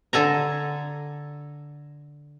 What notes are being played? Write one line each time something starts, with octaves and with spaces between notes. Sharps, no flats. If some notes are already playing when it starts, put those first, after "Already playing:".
D3 A4 G#5 A#5